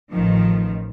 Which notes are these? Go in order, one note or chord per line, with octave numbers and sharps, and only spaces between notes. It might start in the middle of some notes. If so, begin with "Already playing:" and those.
A1 D#3 F3